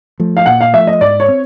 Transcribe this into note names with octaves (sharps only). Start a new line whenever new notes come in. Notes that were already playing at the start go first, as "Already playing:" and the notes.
F3 A3
F5
A#2 F#5
F5
F3 A3 E5
D#5
G#2 D5
C#5
C4